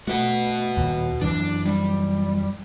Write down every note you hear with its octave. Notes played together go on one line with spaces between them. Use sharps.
A3 F#4 B4 F#5
D#2 A#2
F#2 E3 D4
G3